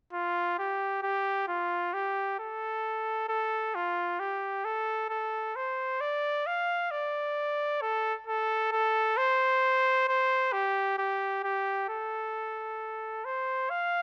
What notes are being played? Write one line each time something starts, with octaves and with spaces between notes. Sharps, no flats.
F4
G4
G4
F4
G4
A4
A4
F4
G4
A4
A4
C5
D5
F5
D5
A4
A4
A4
C5
C5
G4
G4
G4
A4
C5
F5